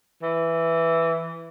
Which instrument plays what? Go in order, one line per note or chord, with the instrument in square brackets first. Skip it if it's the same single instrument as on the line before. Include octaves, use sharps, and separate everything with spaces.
[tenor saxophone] E3